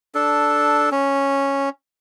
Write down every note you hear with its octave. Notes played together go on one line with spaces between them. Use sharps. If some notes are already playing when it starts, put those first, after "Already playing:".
D4 A4
C#4